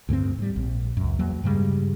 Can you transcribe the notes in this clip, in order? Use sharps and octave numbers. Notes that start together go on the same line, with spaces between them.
D2 G2 G#3 C4
G#2 G3
A#1
C#2 F#2
E2 F#3 A#3
G2 C#3 G3 G#3